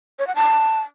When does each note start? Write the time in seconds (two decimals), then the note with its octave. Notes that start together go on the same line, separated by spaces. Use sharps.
0.19 C#5
0.27 F#5
0.35 A5